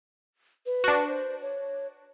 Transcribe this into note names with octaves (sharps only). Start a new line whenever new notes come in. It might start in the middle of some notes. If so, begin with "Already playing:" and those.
B4
D4 F#4
C5
C#5